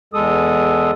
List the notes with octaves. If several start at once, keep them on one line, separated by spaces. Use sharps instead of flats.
E2 G#3 A4 D#6